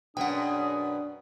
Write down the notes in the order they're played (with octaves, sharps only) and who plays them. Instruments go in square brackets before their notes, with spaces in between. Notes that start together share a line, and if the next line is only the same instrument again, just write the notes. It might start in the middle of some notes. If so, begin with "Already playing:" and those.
[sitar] F#2 B2 [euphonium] D4 [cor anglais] G#4 [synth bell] F#5 G5